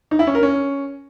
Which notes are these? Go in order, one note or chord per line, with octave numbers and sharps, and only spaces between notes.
D#4
E4
C#4
A#4
C#4